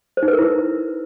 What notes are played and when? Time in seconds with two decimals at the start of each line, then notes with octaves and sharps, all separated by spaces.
0.17 C5
0.23 D#4
0.28 B4
0.33 A#4
0.39 E4